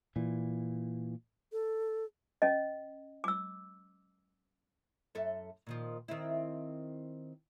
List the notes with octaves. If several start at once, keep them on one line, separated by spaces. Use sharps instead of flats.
A#2 E3
A4
C#4 D#5
D6 E6
F#2 A4 E5
A#2 D#3 F3
D#3 C4 E4